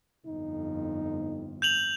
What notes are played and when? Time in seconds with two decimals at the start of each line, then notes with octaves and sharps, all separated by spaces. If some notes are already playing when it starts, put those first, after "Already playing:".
0.27 G1 F2 D#4
1.62 G6 F7 F#7